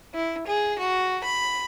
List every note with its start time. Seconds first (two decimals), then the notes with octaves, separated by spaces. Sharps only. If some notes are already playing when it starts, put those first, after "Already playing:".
0.14 E4
0.47 G#4
0.79 F#4
1.24 B5